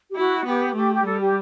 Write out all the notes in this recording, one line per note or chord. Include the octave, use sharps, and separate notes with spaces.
G4
E4 F#4
B3 G4
A3 G4
G4
G3 A4
G4